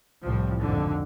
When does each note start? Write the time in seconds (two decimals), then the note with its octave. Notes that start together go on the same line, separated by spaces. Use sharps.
0.25 C2 A2 F3
0.62 G#1 F2 D3